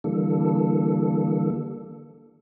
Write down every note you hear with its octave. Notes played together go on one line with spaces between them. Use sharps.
D3 E3 G3 A#3 A4